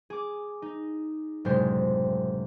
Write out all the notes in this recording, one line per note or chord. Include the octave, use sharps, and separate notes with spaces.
G#4 D6
D#4
F#1 A2 C3 G#3 C5